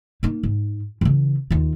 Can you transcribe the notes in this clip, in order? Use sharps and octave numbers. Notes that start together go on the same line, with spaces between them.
A#3 D#4
G#2
C#3 E3
D#2 F4